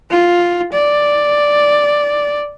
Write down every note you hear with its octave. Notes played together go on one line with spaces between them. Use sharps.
F4
D5